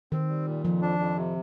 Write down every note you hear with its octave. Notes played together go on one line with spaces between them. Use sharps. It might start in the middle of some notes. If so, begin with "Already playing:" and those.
D#3 C4
G3
A#2
F2 F3
D4
F2
C3